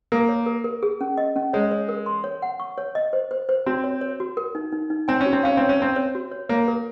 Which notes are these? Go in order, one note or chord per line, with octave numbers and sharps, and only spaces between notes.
A#3 A#4
C#5
A#4
A#4
G#4
C#4
D#5
C#4
G#3 C#5
C#5
A#4
C6
C#5
F#5
C#6
C#5
D#5
C5
C5
C5
C4 F#4
C#5
C#5
F#4
A#4
D#4
D#4
D#4
C4 G#5
C#4
F#4
C4
C#4 F5
C4 C#5
C#4
C4 C#5
C#5
F#4
C#5
A#3 C#5
A#4